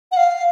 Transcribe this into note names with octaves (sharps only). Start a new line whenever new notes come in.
F#5
F5